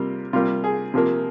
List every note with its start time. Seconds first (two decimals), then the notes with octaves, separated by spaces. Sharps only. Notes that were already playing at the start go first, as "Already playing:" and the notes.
Already playing: C3 G3 A#3 F4
0.33 C3 G3 A#3 F4
0.64 G#4
0.94 C3 F3 A#3